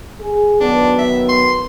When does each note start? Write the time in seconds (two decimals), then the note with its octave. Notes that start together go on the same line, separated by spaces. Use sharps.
0.20 G#4
0.60 D#3 F#3 B3 D4
0.98 E5
1.29 C6